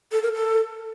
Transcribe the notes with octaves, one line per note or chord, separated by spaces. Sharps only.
A4
A#4
A4